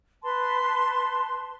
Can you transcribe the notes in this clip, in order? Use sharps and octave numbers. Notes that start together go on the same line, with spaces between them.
B4 A5 C6